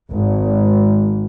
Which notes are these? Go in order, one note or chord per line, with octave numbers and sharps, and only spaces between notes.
G#1